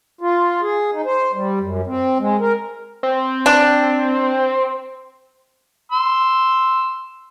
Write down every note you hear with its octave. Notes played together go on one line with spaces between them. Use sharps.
F4
G#4
D#4
C5
G3
F#2
C4
G#3
A#4
C4
D4
C6 E6